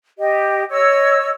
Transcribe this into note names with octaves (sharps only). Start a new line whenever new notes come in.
G4 D#5
C#5 D#5 E6